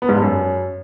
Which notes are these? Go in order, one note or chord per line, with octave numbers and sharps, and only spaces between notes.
B3
G#2
G2
F#2